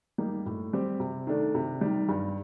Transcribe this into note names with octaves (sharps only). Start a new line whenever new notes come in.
G3 A#3 D#4
A2
G3 C4 G4
C3
D#3 A3 D4
C3
D#3 G3
G2